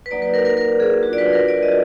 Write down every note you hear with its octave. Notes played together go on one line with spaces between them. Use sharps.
B4
F#3 A#3 D#4 F#4 D5
B4
A#4
A#4
A#4
G#4
F#3 D4 F4 F#4
D5
B4
A#4
D5
D#5